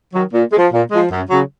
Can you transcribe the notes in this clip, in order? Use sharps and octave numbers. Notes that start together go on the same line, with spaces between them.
D#3 F#3
A#2
G#3
F3
A#2
F3 G#3
F#2
C#3 F#3